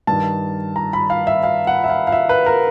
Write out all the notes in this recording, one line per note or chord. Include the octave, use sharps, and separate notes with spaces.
G2 D#3 A5
A#5
B5
F5
E5
F5
F#5
E5
F5
F5
E5
B4
A#4